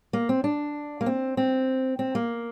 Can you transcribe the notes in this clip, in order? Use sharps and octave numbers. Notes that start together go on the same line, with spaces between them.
A#3
C4
D4
A#3
C4
C4
C4
A#3